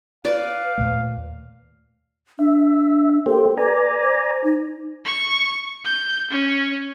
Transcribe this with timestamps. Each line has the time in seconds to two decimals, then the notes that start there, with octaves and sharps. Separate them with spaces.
0.25 B4 D5 F5 D6
0.78 D#2 A#2 A3
2.39 D4 E5
3.26 A#3 G4 A4 C5
3.57 B4 D5 G#5 A#5
4.02 C5
4.44 D#4
5.05 C#6
5.85 G6
6.31 C#4